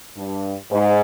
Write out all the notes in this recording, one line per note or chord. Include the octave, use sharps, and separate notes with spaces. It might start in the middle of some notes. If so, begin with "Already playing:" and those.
G2
G#2